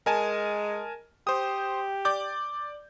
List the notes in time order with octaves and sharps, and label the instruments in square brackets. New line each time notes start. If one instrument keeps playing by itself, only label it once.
[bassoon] G#3 [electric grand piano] A#4 G#5 A5
[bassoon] G4 [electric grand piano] C5 D#6
[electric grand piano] D5 D6 G6